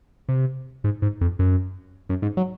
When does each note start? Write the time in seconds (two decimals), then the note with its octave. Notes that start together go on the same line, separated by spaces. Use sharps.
0.29 C3
0.84 G#2
1.02 G#2
1.21 F2
1.39 F#2
2.09 F#2
2.22 G#2
2.37 F#3